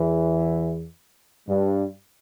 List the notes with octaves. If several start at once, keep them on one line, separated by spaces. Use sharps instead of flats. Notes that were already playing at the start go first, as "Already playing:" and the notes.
Already playing: E2 E3
G2 G3